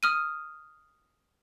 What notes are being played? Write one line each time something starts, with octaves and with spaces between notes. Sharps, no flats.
D#6 F6 D#7